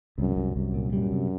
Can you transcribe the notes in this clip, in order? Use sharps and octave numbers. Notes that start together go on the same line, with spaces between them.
C2 F#2
C2
C2 F#2
A#2
F#2 G3
C3